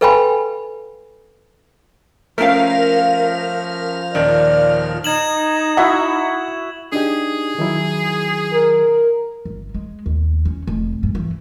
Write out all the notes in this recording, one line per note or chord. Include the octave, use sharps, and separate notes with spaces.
A4 B4 F5 G5 G#5 B5
F3 A3 C#4 A#4 F5 F6
D#1 D#3 D5
D#4 G#6 E7 F#7
E4 F#4 E5 F#5
D4 D#4 G4 G#4
D#3 F#3 E4
A#4
G1
G#3
D#2
C#4
F1
G2
E3